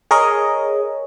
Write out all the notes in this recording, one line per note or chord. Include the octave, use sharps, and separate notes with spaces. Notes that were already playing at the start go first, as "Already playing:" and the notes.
G#4 A#4 C#5 D#5